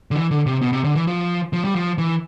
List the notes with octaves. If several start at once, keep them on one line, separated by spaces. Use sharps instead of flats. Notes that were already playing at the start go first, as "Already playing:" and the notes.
D3
E3
D3
C3
B2
C3
D3
E3
F3
F3
G3
F3
E3